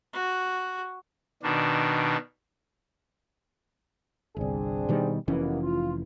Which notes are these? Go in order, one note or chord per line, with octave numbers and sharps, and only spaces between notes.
F#4
B2 D#3 D4
G1 C2 C4 D4 G#4
B2 D#3 G3
F1 B2 E3 A#3 B3 C#4
F4